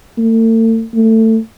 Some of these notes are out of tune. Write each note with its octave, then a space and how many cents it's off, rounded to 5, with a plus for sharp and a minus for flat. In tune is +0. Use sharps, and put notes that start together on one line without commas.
A3 +40
A3 +20